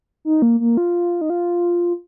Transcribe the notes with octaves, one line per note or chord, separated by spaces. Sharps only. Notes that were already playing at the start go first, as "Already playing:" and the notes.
D#4
A#3
A#3
F4
D#4
F4